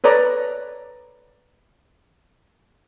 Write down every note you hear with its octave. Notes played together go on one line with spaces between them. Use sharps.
A4 B4 C#5 D5 A#5